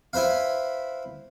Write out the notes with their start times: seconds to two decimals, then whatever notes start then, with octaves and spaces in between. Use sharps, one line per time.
0.13 E4 B4 C5 F5